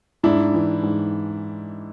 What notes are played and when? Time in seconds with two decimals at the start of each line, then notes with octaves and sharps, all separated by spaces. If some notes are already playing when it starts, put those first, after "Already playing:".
0.23 G#2 D4 E4
0.54 E3
0.83 G#2